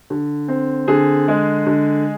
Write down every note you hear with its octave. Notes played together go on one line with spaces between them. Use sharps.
D3
C4
D3 G#4
G#3
D3